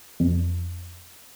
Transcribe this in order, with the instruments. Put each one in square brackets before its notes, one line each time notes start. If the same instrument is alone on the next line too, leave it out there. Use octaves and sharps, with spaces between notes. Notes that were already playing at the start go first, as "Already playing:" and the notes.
[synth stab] F2